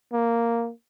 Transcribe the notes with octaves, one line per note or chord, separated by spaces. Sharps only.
A#3